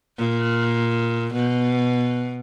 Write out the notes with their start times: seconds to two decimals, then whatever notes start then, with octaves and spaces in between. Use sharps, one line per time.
0.18 A#2
1.34 B2